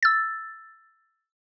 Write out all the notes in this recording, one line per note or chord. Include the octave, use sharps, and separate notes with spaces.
E6 A6